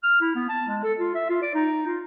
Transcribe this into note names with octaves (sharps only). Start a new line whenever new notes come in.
F6
E4
B3
A5
G#3
A4
F4
E5
F4
D5
D#4
F4